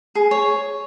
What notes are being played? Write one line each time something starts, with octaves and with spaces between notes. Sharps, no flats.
G#4
C#5